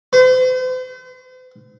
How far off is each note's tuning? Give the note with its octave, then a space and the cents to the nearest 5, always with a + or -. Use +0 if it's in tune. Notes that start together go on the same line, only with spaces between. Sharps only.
C5 -45